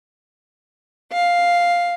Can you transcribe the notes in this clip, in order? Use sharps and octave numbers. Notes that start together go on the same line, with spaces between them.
F5